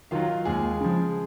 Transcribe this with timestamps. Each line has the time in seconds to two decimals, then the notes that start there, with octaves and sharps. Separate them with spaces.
0.11 D#3 F#3 F4 F5
0.45 D#2 G#3 G#4
0.80 C#3 F3